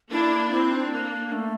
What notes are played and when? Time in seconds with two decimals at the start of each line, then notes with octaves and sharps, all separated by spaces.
0.12 A#3 D4 E4
0.51 C4 E4
0.71 D4
0.91 A#3
1.32 A3